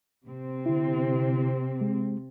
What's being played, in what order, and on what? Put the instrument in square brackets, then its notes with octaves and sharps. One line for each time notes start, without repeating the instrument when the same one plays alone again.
[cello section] C3 C4
[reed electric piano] D3 E4
G#3